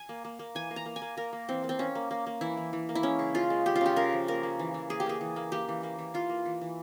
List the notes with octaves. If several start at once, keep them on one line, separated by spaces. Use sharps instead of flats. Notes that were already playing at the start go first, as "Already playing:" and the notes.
Already playing: G#5
A#3
A#3
A#3
E3 G#5
A#3
A#5
A#3
G#5
A#3
A#3 A#4
A#3
E3 C4
A#3
C4
A#3 C#4
A#3
A#3
A#3
E3 E4
E3
E3
A#3
E4
G#3 C#4
C#3
C#3 F4
G#3
G#3 G4
F4
C#3 G4
C#3 A#4
F3
A#3 A#4
A#3
E3
E3
A#3 G#4
G4
A#3 G#4
E3
A#3
A#3 G4
E3
A#3
E3
E3 F4
A#3
E3
E3